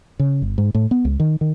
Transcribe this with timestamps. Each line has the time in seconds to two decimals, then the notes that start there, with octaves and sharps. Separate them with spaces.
0.19 C#3
0.42 G1
0.58 G#2
0.75 A2
0.91 B3
1.05 C#2
1.20 D#3
1.41 D#3